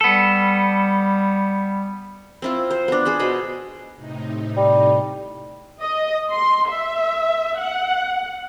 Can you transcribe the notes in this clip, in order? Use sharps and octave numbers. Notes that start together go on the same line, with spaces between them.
G3 B3 A4
C4 E4 F4
C5
B3 D4
G#4 C5 B5
B2 D#5 B5
A2 C3 D#4
G3
D#5
C6
E5
F#5